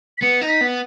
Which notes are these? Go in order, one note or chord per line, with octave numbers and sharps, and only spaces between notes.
B6
B3 C#7
D#4
B6
B3